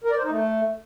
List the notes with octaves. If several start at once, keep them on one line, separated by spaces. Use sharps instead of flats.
A#4
D5
C5
D#4
A3